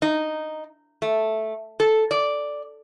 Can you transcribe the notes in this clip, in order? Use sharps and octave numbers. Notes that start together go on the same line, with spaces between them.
D#4
A3
A4
D5